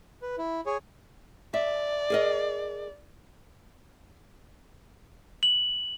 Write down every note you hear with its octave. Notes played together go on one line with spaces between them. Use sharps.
B4
E4
G#4 C#5
D5 E5
G#4 A#4 D#5
F#7